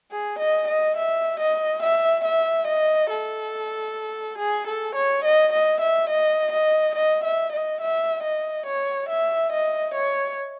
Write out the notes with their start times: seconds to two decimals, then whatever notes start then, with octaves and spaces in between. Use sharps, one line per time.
0.12 G#4
0.40 D#5
0.68 D#5
0.97 E5
1.40 D#5
1.83 E5
2.25 E5
2.68 D#5
3.10 A4
4.38 G#4
4.68 A4
4.96 C#5
5.24 D#5
5.53 D#5
5.81 E5
6.10 D#5
6.53 D#5
6.96 D#5
7.24 E5
7.53 D#5
7.81 E5
8.23 D#5
8.67 C#5
9.10 E5
9.53 D#5
9.95 C#5